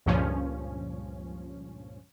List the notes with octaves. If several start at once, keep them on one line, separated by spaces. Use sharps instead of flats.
C#2 G2 A#2 F3 C#4